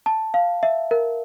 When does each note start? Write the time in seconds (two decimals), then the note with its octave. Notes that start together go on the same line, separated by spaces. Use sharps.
0.06 A5
0.34 F5
0.63 E5
0.91 A#4